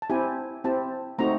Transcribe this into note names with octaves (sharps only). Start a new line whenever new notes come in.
A5
C4 E4 G4 G#5
C4 E4 G4 A5
A3 C4 D#4 F#4 A#5